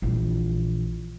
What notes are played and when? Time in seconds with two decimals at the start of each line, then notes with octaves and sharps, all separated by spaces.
0.02 A#1 E3